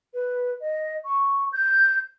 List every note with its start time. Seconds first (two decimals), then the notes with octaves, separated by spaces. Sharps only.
0.14 B4
0.61 D#5
1.05 C#6
1.53 G6